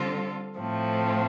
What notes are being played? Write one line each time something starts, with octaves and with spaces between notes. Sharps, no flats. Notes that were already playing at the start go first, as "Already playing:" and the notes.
Already playing: D3 G3 C4 F4 A4
A2 F3 A3 C4